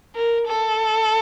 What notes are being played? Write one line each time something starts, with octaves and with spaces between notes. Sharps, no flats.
A#4
A4